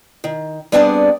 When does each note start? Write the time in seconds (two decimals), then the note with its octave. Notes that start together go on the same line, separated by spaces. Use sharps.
0.24 D#3
0.72 G3 B3 C4 D4 G#4 D5